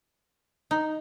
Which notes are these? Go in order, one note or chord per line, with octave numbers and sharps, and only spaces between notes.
D#4